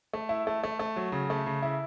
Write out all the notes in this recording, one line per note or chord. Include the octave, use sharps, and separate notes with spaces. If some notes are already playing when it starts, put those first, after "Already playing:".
A3
E4
A3
A3
A3
F#3
C#3
A3
C#3
E4